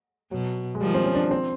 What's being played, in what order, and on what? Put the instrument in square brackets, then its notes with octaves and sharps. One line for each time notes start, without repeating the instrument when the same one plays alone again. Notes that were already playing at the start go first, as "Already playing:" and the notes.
[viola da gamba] B2 [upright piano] F#3
[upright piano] G#3
[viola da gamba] D#3 F3 [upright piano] G3
[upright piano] C4
C#4
D4
C4